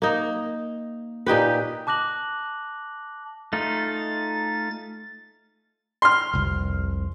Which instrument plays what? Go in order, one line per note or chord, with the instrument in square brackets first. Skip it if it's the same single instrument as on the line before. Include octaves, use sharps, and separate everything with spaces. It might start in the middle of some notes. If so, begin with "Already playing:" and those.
[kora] A#3 D#4
A#2 D#4 G4 B4
[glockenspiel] A5 D6 F#6 A#6 F#7
[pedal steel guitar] A3 D#4 F4 [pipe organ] A6
[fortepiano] C6 F6
[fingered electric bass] F1 C2